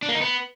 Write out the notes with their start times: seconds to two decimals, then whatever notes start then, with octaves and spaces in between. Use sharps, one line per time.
0.03 D4
0.09 A#3
0.15 D#4
0.21 B3